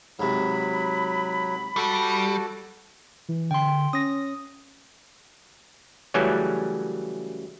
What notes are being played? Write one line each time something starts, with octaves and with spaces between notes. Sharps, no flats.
G#2 C3 F#3 B5
G3 F#4 A4
E3
D3 G5 C6
C#4 D#6 A#6
C#3 E3 F#3 G3 A3 C#4